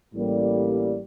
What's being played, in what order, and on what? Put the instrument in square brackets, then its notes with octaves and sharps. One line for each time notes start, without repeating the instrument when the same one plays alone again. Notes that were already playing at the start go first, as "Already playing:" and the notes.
[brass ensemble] A1 A2 G3 A#3